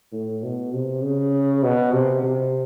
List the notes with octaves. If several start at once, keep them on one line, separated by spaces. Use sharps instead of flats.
A2
B2
C3
C#3
B2
C3
C3